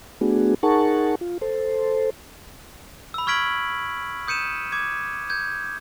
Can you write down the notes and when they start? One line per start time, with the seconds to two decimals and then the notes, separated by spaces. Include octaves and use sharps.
0.21 A3 B3 D4 F#4 G#4
0.63 D#4 G#4 A#4 F#5 A5 C#6
1.21 F4
1.41 A4 C5
3.14 B5 E6
3.27 C#6 F6 G#6 B6 D7 F#7
4.27 D#6 G6 C#7 D#7 E7
4.72 D6 G#6
5.30 G6 G#6